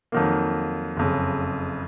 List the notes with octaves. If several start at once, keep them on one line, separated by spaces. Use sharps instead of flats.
F2 D#3 F#3 A#3
F#1 F2 C#3